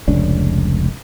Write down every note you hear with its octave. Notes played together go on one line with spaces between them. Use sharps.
F1 C#2 C#4 D4